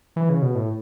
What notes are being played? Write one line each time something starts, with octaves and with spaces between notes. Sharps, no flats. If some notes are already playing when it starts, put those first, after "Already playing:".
E3
C#3
B2
A2